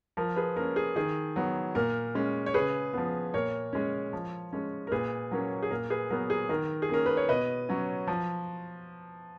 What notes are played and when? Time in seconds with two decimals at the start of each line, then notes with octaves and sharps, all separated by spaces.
0.17 F3 A#4
0.36 G#4 B4
0.56 A#3 C#4 A#4
0.76 G#4
0.96 D#3 G#4
1.36 F#3 B3
1.75 A#2 A#4
2.15 G#3 C#4
2.46 C#5
2.54 C#3 G#4 B4
2.94 F3 B3
3.34 A#2 A#4 C#5
3.73 G#3 C#4
4.13 F3
4.53 G#3 C#4
4.87 A#4
4.92 A#2 G#4 B4
5.31 F#3 A#3 C#4
5.63 G#4
5.71 A#2 A#4
5.90 G#4 B4
6.10 F#3 B3 A#4
6.30 G#4
6.49 D#3 A#4
6.82 G#4
6.89 A#3 C#4 A#4
7.06 B4
7.17 C#5
7.29 B2 B4 D#5
7.69 F#3 C#4
8.07 F3